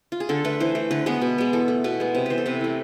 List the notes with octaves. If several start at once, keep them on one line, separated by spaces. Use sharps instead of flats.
F4
G#4
D3 A4
A3 B4
E3 C5
A3
D3 B4
G#3 B3 B4
B2
G#3 B3
E3 A4
A3
B2 B4
G#3 B3
C3 B4
E3 B3 B4 C5
A4
C3 B4
E3 A3